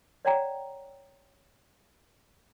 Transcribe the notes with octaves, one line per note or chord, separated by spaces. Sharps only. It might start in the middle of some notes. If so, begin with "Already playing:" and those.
C#5 D5 F#5 G5 A#5